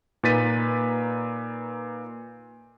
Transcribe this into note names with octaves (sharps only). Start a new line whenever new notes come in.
A#2 D#4 B4 A6 B6 D#7